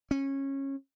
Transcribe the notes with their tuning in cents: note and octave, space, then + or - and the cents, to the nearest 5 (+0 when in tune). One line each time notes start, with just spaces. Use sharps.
C#4 -20